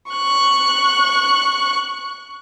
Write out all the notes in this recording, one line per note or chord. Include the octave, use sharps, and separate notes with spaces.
C#6 F#6